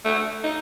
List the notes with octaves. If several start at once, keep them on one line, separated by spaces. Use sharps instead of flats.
A3
D#4